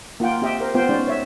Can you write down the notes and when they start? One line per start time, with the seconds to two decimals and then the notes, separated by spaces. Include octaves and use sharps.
0.20 A#3 F4 F#5 G5
0.42 C4 G4 D#5 E5 G5
0.60 A#4 C5
0.74 A3 B3 C4 F4 C5 G5
0.89 G#3 C#4 D#4 D5
1.08 C#5 E5